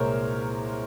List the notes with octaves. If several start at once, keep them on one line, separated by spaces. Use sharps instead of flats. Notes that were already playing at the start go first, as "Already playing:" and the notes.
Already playing: C2 A#2 G#3 A#4 C5 C#5